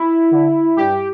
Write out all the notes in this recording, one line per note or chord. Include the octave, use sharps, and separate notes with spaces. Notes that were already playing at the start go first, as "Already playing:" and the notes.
Already playing: E4
D3
G2 G4